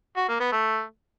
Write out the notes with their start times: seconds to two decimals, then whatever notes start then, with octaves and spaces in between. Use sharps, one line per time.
0.17 F#4
0.28 A#3
0.40 B3
0.52 A3